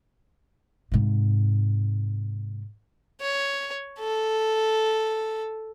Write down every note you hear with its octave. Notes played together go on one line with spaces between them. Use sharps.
G#2 C3
C#5
A4